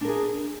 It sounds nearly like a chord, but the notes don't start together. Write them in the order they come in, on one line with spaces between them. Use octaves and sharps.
D4 A#4 G#4